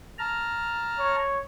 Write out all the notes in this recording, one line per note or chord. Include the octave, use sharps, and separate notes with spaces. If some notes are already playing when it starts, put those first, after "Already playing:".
A5 A#5 F6
C#5